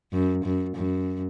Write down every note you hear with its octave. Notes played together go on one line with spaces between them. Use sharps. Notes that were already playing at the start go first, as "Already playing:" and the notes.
F#2
F#2
F#2